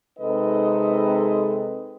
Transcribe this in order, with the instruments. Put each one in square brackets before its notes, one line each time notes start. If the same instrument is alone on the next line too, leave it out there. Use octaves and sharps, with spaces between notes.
[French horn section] C3 G#3 D#4 A4 B4 D#5